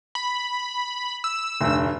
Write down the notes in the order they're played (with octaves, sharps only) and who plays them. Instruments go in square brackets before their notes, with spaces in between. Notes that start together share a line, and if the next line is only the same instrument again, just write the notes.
[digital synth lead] B5
E6
[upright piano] F1 D2